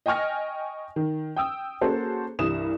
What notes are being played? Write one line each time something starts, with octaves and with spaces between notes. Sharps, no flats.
D#5 G5 G#5 C#6 F6 A#6
D#3
G5 D#6 E6
A#3 C#4 F#4 G#4 A4 C5
C2 G2 E3 G3 D#6 E7